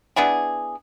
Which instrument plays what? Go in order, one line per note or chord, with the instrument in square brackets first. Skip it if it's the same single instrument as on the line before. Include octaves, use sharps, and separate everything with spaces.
[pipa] B3 D4 E4 G#4